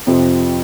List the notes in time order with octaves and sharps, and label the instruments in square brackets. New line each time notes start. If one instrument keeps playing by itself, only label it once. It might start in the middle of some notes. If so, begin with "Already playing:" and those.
[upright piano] F2 C3 F3 C4